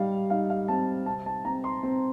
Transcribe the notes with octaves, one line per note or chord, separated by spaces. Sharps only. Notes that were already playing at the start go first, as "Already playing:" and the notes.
Already playing: G3 D#4 F5
D#4 F5
F5
C4 A5
C3 A5
A5
C4 A#5
C6
C4